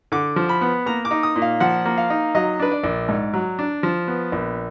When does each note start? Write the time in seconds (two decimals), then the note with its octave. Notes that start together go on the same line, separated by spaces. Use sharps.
0.12 D3 D6
0.36 F3
0.49 B5
0.61 B3
0.86 A#3 A#5
1.05 D6
1.11 D#4
1.23 D#6
1.36 A#2
1.42 F5
1.60 F3 F#5
1.85 A#3
1.98 F5
2.10 D#4
2.35 F#3 D#5
2.59 D4 B4
2.71 D5
2.84 A#1
3.09 G#2
3.34 F#3
3.59 D4
3.83 F3
4.08 B3
4.32 A#1